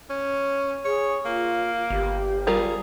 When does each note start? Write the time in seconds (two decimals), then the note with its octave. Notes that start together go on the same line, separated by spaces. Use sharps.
0.10 C#4
0.85 G#4 C#5
1.25 A#3 F4
1.90 G1 G4
2.47 G3 F4 G#4 A#4